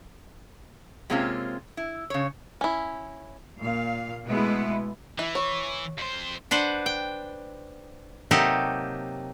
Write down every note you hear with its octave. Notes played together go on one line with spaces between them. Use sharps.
C3 G#3 A#3 C4 C#4 F4
E4
C#3 C#5
C#4 E4
A#2 F5
B2 G#3 A3 B3 E4
E3 E4
C#5
F2 C5
D4 B4 C5 F#5
G5
C3 F#3 A#3 D#4 G4 A4